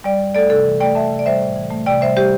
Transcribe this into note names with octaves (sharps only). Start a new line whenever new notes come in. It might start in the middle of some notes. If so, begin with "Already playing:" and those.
G3 D5 G5
G2
A3 A4 D5
C3 A4
E3
A3 D5 G5
A3 E5 A5
C3
D5
G3 C5 E5
A2
E3
A3
C3 D5 G5
G3 C5 E5
G3 G4 C5